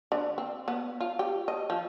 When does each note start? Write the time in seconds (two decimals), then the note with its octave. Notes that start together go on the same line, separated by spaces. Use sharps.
0.12 D3
0.38 C4
0.68 B3
1.00 F4
1.19 G4
1.48 D#5
1.70 F3